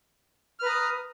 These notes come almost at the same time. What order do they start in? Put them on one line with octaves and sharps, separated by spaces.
F6 B4 A#5 D#6